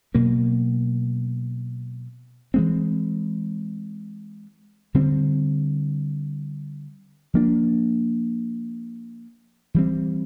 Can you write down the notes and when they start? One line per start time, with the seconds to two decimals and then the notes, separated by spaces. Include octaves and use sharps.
0.14 B2 F#3 A#3
2.54 E3 G#3 C4
4.94 D3 G3 C4
7.34 F3 A#3 D4
9.74 E3 G3 C4